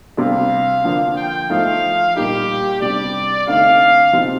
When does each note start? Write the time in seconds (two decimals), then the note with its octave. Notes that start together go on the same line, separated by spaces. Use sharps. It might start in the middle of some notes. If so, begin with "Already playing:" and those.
0.17 C3 G3 D4 F5
0.84 D3 F3 A#3 D4
1.16 G5
1.50 F3 A3 D#4 F5
2.16 A#2 G3 A#3 D#4 G4
2.81 C3 G3 D4 D5
3.47 D3 A3 C4 D#4 F5
4.13 C3 F3 C4 D#4